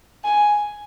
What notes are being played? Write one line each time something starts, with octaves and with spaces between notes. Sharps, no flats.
G#5